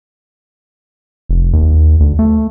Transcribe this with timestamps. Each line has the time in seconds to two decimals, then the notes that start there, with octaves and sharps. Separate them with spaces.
1.29 F1
1.53 D#2
2.00 D2
2.19 A3